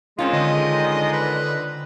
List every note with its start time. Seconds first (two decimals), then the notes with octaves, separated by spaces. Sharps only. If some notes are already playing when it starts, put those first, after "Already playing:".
0.19 D#3 G#3 C4 C#4 F4
0.33 D3 D#5
1.13 B4